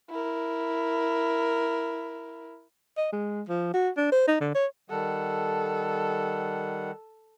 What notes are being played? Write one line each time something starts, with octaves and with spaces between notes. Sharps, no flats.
E4 A#4
D#5
G#3
F3
F#4
D4
C5
D#4
D3
C#5
D#3 G3 A4 F#5